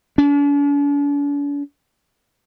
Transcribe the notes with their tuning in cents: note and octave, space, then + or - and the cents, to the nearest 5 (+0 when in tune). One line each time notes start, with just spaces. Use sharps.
D4 -45